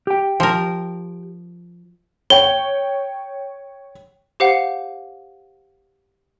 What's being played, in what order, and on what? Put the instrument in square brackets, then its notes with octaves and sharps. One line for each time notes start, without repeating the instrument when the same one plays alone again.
[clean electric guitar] G4 G5
[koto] F3 A#4
[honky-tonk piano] C#5 G5 [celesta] G7
[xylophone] G4 C5 F5 F#5